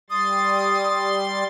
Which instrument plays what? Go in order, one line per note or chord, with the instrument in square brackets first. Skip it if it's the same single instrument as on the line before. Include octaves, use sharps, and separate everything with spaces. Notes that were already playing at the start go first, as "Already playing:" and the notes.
[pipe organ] G3 C6 A6 [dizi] D#6